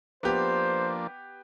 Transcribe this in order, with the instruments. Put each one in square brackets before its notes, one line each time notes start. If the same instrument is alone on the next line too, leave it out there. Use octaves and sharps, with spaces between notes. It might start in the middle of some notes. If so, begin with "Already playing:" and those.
[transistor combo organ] F3 A#3 D4 [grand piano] B3 G4 [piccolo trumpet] C5